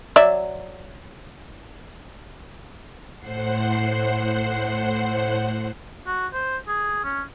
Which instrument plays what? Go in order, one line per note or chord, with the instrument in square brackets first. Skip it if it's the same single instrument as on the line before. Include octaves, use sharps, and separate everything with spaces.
[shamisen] F#3 D5 E5
[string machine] A2 C5 F#5 C7
[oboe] F#4
C5
G#4
C#4